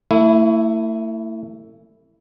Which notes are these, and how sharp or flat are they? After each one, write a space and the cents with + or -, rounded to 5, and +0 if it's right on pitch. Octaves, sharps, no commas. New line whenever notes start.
A3 +40 E4 +0